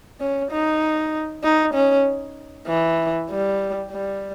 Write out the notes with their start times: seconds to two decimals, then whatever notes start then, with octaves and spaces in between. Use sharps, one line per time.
0.20 C#4
0.51 D#4
1.44 D#4
1.74 C#4
2.68 E3
3.30 G3
3.92 G3